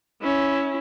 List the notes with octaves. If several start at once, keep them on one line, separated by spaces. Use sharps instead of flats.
C#4 E4